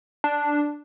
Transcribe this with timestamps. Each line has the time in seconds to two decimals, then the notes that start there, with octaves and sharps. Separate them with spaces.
0.24 D4